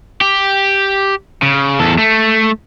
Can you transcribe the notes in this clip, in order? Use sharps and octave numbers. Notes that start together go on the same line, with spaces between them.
G4
C#3
E2 A4
A3